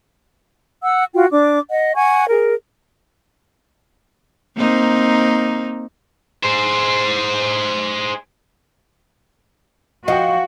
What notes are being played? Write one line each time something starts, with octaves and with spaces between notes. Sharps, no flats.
F#5 E6
F4 F#4 G5
D4 D6
D#5 F#5
F#5 G#5 C#6 G#6
G#4 A#4
A#3 C4 D#4
G#4 C5
F3 F#4 D#5 F#5 G5